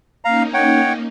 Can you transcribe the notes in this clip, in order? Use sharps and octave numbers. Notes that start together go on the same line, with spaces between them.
A#3 C#4 D#4 F5 A#5
C#5 F#5 G5